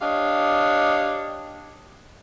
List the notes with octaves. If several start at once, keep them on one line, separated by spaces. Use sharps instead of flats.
D4 G4 C#5 D#5 F5